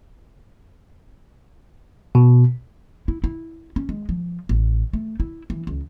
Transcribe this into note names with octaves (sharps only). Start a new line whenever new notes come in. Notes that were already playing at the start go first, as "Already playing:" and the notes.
B2
E4
E4
C#4
G#3
F3
A1
A3
E4
E3
C#2